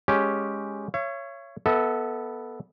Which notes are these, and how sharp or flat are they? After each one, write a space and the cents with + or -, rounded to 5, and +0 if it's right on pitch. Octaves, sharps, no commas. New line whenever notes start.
G#3 +0 C#4 +0 G4 +0
C#5 +0 E5 +45
B3 -10 A4 +0 E5 -35